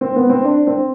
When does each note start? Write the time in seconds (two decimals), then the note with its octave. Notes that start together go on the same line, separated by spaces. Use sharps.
0.01 C4
0.16 B3
0.30 C4
0.45 D4
0.67 C4